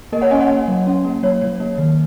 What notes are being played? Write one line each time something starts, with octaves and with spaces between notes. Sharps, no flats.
A#3 A#4 D#5
C#5 F#5
C#4 D#5 G#5
C#5 F#5
A#3
F#3
C#4
A#3
F#3 C#5
F#3
A#3
D#3